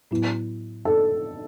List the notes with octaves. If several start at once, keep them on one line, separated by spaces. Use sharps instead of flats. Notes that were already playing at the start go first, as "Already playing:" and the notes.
A2 F#3 B3 E4 B4
A4